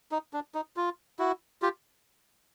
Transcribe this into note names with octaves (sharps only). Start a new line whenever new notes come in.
D#4
D4
D#4
F4
E4 F#4
F4 G4